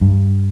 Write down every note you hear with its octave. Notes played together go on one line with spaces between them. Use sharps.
G2